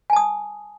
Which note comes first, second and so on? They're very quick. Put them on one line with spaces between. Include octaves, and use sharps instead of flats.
G#5 A5 D#6